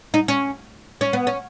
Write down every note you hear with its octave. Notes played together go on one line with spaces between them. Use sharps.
D#4
C#4
C#4
B3
C#4